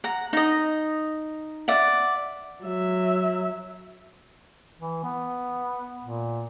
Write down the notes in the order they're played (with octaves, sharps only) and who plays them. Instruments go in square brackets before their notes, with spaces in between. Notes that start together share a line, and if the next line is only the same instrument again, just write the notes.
[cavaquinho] F#5 A#5
D#4 D#5
D5 E5 F#5
[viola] F#3 E5
[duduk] E3
B3
A#2